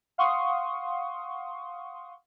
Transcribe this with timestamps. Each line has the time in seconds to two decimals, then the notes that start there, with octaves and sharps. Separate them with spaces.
0.18 F5 F#5 C6 C#6 D#6